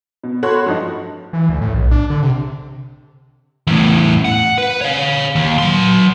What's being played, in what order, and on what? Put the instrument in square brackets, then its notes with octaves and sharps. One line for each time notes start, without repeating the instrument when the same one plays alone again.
[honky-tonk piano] B2
F#4 A4 C#5 B5 C6 F#6
G2 F3 D#4
[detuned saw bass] E3
D2
A2
B1
D4
D3
C3
[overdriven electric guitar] E2 A2
F#5
B4
C#5 F5
D#2
F#3 C6